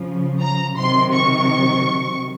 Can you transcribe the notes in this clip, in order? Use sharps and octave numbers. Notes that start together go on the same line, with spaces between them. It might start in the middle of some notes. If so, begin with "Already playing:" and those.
Already playing: C#3 F3
A#5
C3 D#3 F#3 C6
C#6